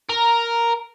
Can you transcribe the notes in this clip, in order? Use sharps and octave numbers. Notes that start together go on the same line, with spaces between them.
A#4